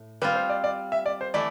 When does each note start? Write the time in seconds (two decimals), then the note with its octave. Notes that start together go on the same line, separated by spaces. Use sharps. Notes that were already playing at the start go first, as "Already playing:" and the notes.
Already playing: A2
0.22 G3 C4 F4 B4
0.35 C5
0.50 D5
0.64 D5
0.92 E5
1.06 D5
1.21 C5
1.34 E3 A3 E4 D5